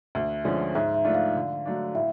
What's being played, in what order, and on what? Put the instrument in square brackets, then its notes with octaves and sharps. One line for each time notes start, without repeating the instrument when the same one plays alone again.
[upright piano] D2 [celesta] E5
[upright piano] D3 F3 G#3 C#4
[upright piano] G#2 [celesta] E5
[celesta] E5
[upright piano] F3 A3 D4 F4
[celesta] F5
[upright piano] D3
F#3 A3 D4
[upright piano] A2 [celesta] E5